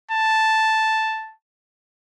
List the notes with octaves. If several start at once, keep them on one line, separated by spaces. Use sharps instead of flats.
A5